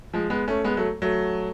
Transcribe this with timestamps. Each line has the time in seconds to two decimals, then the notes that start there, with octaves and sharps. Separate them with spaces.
0.13 F3 G#3
0.30 G#3 B3
0.48 A3 C#4
0.64 G#3 B3
0.77 F#3 A3
1.02 F#3 A3